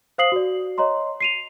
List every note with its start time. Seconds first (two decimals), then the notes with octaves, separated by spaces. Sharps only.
0.18 C5 F5 D#6 C7 F#7
0.32 F#4 D5
0.78 C#5 D#5 A#5 C6
1.21 C7 D#7 F7